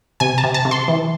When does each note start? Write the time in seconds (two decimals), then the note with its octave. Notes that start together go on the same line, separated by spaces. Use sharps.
0.20 C3 G#5
0.38 A5
0.44 C3
0.54 A5
0.65 C3
0.71 C6
0.88 E3